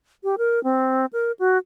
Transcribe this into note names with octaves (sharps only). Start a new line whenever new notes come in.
G4
A#4
C4
A#4
F#4